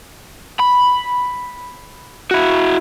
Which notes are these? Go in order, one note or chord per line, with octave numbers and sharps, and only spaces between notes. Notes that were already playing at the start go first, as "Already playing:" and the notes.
B5
E4 F#4